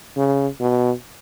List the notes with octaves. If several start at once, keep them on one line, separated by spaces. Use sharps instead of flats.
C#3
B2